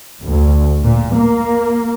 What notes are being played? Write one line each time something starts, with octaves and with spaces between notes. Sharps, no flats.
D2
A#2
A#3